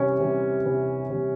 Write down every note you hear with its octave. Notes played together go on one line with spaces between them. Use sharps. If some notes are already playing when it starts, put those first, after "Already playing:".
Already playing: C3 E3 G3 C#4
C3 E3 G3
C3 E3 G3
C3 E3 G3